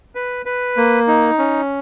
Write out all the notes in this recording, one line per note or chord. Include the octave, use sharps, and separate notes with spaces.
B4
B4
A#3
D#4
C#4